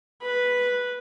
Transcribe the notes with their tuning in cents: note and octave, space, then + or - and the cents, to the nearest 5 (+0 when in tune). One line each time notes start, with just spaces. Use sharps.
B4 -5 B5 -5